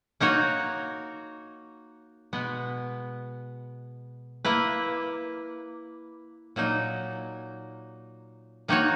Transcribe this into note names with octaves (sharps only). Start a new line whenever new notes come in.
A#3 D#4 F#4 A#4 C#5
B2 G#3 B3
A#3 E4 B4
A#2 F#3 A#3 D#4
D#3 A#3 D#4 F#4 C#5